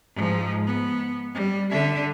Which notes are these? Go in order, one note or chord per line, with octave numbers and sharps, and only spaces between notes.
G#2 F3
B3
G3
D3 E5